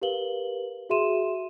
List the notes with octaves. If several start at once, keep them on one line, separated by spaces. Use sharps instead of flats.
G4 A#4 B4 F5 F#7 G7
F#4 G#4 E5 C6 D#7 E7